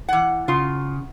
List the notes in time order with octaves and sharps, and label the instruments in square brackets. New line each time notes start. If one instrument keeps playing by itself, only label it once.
[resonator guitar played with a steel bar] E3 F#5
[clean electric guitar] C#3 [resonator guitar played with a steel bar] F4